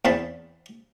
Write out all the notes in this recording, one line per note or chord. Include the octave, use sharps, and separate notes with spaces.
E2 E3 C4 A5 B5